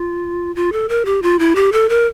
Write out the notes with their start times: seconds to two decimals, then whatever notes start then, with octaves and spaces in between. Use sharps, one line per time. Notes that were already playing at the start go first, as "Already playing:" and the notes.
Already playing: F4
0.56 F4
0.72 A4
0.89 A#4
1.05 G4
1.22 F4
1.39 E4
1.56 G4
1.72 A4
1.89 A#4